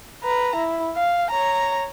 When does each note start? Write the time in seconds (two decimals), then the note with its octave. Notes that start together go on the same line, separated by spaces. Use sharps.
0.23 B4 A#5
0.56 E4
0.96 F5
1.31 C#5 A#5